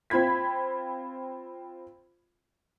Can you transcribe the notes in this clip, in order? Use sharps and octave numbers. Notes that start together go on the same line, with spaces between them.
C4 F4 B5 G#6 B6